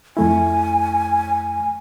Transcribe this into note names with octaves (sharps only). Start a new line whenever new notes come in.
F2 A3 E4 G#5